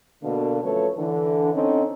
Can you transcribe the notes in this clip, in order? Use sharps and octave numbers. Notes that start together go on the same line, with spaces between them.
B2 D3 A#3
F#2 F3 A3 A4 B4 C#5
D3 E3
D3 C4 C#4 D#4